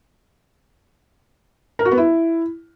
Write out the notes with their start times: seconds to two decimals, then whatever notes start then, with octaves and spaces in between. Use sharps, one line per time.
1.79 A#4
1.85 F#4
1.91 B3
1.98 E4